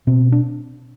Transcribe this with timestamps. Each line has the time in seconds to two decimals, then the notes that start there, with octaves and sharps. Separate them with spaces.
0.07 B2 C4
0.32 D4